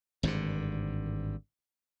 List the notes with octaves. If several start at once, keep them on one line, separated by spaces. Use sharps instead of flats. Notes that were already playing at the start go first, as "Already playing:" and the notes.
G#1 G2 A#2 D3